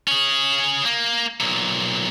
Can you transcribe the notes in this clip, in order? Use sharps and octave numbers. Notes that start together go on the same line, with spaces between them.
C#4 G#4
A#3
B1 A#2